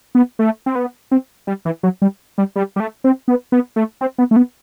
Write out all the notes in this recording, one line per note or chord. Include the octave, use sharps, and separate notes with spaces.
B3
A3
C4
B3
C4
G3
E3
F#3
G3
G3
G3
G3
A3
C4
B3
B3
A3
C4
B3
A3
B3